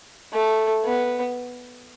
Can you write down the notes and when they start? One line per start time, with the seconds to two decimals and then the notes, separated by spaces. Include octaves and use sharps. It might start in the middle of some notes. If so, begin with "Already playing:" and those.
0.33 A3
0.85 B3